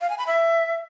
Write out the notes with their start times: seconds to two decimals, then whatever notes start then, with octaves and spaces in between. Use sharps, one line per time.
0.01 F5
0.10 G#5
0.18 B5
0.27 E5